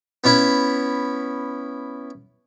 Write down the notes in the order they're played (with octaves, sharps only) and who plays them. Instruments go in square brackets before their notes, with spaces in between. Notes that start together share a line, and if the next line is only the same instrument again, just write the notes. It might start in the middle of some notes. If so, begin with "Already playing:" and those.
[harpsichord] B3 C#4 E4